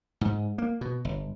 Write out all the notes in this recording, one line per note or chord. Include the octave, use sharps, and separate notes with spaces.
G#2
A#3
B2
G1